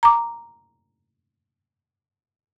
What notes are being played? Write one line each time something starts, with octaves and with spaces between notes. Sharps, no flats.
A#5 D6